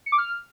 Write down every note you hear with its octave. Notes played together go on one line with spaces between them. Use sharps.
C#7
D6
F6